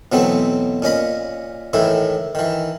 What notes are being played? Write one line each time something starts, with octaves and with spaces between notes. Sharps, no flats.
B2 E3 F#3 A3 B3 C4
A#2 C#4 D#5 B5
A2 D#3 E3 E4
D#3 E3